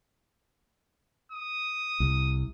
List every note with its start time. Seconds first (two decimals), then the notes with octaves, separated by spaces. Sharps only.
1.32 D#6
2.00 C2